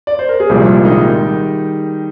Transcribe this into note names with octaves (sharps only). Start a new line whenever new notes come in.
D5
C5
A#4
G#4
C2 A#2 F3 G3 G#3 G4
D#3 D#4